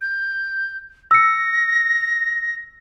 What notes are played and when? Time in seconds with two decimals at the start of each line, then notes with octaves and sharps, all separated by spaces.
0.01 G6
1.11 E6 A#6 C#7